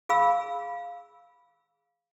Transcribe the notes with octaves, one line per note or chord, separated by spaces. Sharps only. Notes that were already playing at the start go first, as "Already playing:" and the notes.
G#4 F5 B5 E6